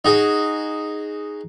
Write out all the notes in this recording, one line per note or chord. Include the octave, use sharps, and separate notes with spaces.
D#4 F#4 G#4